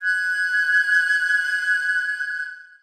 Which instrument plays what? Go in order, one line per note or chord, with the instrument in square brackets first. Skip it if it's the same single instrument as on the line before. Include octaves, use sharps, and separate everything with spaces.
[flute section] F#6 G#6